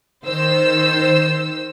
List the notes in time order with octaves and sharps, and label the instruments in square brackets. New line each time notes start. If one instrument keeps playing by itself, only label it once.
[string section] D#3 C5 E6